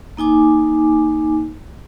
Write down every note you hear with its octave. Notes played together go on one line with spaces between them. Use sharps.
A#3 D#4 G#5 D6